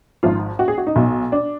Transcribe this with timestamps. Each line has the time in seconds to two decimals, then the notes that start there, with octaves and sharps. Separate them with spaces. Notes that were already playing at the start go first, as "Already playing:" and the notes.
0.23 G#1 G#2 F3 F4
0.59 F#4
0.68 G#4
0.78 F#4
0.87 D#4
0.96 B1 B2
1.32 D4